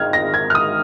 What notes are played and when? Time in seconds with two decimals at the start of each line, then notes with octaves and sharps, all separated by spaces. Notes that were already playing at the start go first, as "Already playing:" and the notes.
Already playing: G#1 G#2 D#3 F6 G#6
0.13 A#6
0.34 G#6
0.50 F6
0.55 D#6